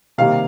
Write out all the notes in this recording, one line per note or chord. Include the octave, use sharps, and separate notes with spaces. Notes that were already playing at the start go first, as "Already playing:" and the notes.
C3 D#3 G3 A#3 F5